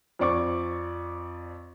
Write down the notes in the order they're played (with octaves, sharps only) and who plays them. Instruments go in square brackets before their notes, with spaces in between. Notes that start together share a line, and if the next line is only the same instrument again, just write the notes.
[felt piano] F2 C4 D5 C#6 D6